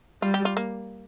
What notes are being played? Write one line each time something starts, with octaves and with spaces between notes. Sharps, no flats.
G3 F4
G4
F4
A#3